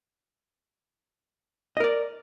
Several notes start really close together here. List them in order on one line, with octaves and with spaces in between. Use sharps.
D#5 A#4 D5